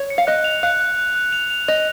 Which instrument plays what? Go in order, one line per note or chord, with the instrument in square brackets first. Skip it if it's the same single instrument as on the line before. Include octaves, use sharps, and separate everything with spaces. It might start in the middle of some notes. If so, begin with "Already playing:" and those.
Already playing: [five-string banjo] C#5
[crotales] C#7
[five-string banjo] F5
[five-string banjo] D#5 [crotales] F#6
[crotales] F7
[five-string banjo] F5 [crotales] F#6
[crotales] F#6
F#6
F#6
F7
F7
[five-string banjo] D#5 [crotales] F7